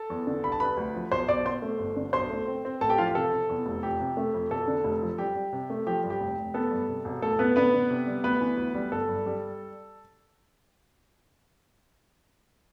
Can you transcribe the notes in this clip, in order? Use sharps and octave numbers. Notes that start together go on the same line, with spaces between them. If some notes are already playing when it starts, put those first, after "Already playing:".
Already playing: A4 A5
E2
D3
C2 B5
A5
C2 B4 B5
D2
F3
B1 C5 C6
B1 D5 D6
B2 C5 C6
A3
G1
D3
B1 C5 C6
A3
C4
C4
A1 A4 A5
G4 G5
F3 F4 F5
G4
C3 A4
C3
E2
F1
F2 G4
C3
A3
F2
E1 A4
D3
F1
F3
G3 G4
G3
C3
A3
F3 G4
G2
G4
F1
F1
B3 A4
G2
C3
E1
A2 A4
A2 B3 B4
D3 B3 B4
D3
C3
G3
D2 B3 B4
E3
D2
G3
G1 A4
G2
G3